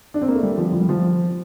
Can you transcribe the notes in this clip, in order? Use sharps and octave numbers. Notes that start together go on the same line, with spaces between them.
D4
C4
A#3
A3
G3
F3
F3
G3
F3